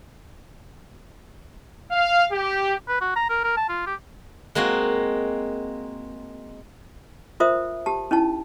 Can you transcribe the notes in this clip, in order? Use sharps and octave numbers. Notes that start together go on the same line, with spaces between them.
F5
G4
B4
F#4
A#5
A#4
A#4
A5
F4
G4
G#3 A#3 C4 F#4
F4 A#4 C5 E5 D#6
G4 A5
C#4 D#4 E4 A5